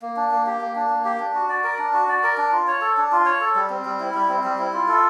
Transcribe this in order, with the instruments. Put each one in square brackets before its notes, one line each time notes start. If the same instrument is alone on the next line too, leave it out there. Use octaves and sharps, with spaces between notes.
[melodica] A#3
D4
A#3
G4
A#3
D4
A#3
G4
D4
F#4
D5
A#4
D4
F#4
D5
A#4
D4
F4
C#5
A4
D4
F4
C#5
A4
G3
C4
G3
E4
G3
C4
G3
E4
F4
A4